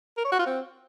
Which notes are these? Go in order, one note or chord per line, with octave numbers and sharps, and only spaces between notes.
A#4
C#5
F#4
F4
C4